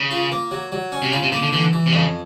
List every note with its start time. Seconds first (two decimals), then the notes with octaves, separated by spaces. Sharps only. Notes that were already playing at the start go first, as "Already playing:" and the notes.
Already playing: C#3
0.11 F4
0.32 A#3
0.51 F#3
0.72 F#3
0.92 C#4
1.02 C3
1.12 C#3 F4
1.22 C3
1.32 C#3 A#3
1.42 D3
1.52 D3 E3
1.73 E3
1.86 C3
1.92 F2 C#3